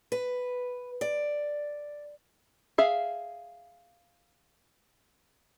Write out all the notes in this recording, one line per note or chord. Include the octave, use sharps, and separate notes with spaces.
B4
D5
G#4 E5 F5